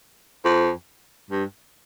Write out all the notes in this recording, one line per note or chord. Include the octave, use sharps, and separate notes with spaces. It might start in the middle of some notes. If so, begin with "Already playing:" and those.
F2
G2